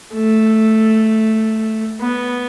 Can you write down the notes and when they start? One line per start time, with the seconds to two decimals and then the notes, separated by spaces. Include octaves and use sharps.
0.14 A3
2.00 B3